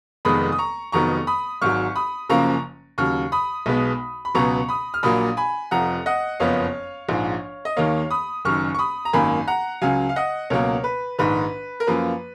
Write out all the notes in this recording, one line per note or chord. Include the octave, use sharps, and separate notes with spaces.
F1 F2 D#3 G#3 B3 B5 D#6
D#6
A#5 C#6
F1 F2 D#3 F#3 B3 A#5 C#6
B5 D#6
G#1 G#2 F#3 C#6 F6
B5 D#6
F#1 F#2 C#3 F3 A#3 A#5 C#6
D#2 C#3 F#3 C#6 F6
B5 D#6
B1 B2 G#3 B3
B5
C#2 B2 F#3 B3 A#5 C#6
B5 D#6
F6
A#1 A#2 F#3 A#3 B5 D#6
G#5 B5
F1 F2 F3 F#5 A#5
D#5 F#5
F#1 F2 F3 B3 C#5 F5
A#1 G#2 F3
D#5
D#2 D#3 A#3 C#5 F5
B5 D#6
F#1 F#2 D#3 C#6 F6
C#6
B5 D#6
A#5
G#1 F#2 D#3 A#3 G#5 B5
F#5 A#5
C#2 C#3 F#3 F5 G#5
F5
D#5 F#5
C#2 B2 F#3 A#3 A#4 C#5
B4
A#1 G#2 D#3 B4
A#4
F#2 F3 A#3 B4